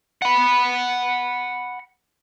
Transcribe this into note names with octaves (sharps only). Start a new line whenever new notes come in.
F#5 B5